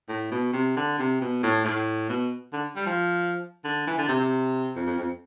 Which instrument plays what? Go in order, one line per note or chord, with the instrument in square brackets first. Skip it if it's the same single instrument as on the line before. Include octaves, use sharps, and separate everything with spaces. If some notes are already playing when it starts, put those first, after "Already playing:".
[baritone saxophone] A2
B2
C3
D3
C3
B2
A2
A2
B2
D3
G3
F3
D3
E3
D3
C3
C3
F2
F2
F2